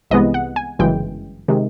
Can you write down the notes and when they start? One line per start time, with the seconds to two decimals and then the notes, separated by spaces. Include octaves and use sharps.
0.11 C2 C3 E3 G#3 B3 D#5
0.34 F#5
0.56 G#5
0.79 G1 F#2 C#3 E3 G#3 G5
1.48 C3 D#3 G#3